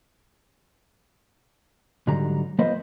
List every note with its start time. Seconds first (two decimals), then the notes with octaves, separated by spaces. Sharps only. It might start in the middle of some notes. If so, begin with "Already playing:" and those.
2.07 G#2 D3 F#3 G3 A#5
2.59 F3 A#3 B3 B4 C5 D#5